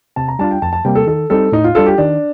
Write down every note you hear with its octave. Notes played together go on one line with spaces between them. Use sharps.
C3 A5
A#5
G3 D4 F4 A5
G5
F2 A5
A5
C3 G3 A#3 G5
A4
D#3 A4
G3 C4 D#4 A4
A2 D#4
F4
G3 D4 F4 A4
G4
D#3 D4